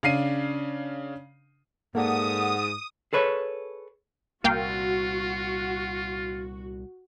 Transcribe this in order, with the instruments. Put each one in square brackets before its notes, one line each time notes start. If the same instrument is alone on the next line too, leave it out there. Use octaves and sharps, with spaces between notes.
[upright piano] C#3 D4 F5 C7 D#7
[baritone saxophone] G#2 [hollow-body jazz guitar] A#3 A4 D5 [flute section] F#5 [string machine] D#6
[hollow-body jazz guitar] G#4 A4 B4 C#5
[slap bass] C2 A#2 [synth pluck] A#3 F5 G5 [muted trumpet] F4 [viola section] F#4